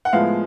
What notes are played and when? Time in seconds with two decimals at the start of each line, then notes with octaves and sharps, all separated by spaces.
0.05 F#5
0.13 A2 F3 G#3 B3 F5